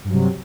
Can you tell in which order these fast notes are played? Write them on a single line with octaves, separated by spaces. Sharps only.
G2 F#3 C3